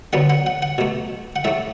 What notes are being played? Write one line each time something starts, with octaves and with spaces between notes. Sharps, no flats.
D3 F#3 B3 F#5
F#5
F#5
F#5
B2 A3
F#5
A2 A3 E5